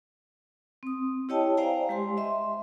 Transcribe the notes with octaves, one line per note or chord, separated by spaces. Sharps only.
C4 D#6
E4 G4 C#5 D#5 G5 A5
C5 D5 F5 G5 G#5 A#5
G#3 G4 G#5 C6
D#5 E5 C6